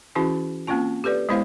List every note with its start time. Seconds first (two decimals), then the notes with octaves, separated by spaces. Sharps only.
0.15 E3 C#4 E4 F#4 G#4
0.67 A#3 C4 C#4 F4 A5
1.04 G4 A4 B4 D5
1.29 G#3 B3 E4 C5 F5